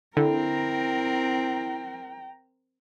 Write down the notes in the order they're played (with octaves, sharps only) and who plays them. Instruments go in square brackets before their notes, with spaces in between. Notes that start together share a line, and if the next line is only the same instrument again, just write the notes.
[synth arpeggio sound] D3 [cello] C4 A#4 [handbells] E4 [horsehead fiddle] G5 A#5